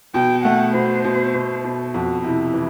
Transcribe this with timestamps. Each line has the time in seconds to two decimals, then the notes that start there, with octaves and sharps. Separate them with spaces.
0.14 B2 G5
0.44 A3 F#5
0.74 B2 C5
1.04 B2
1.34 B2
1.64 B2
1.94 F2 F#4
2.24 C3 E4
2.54 E3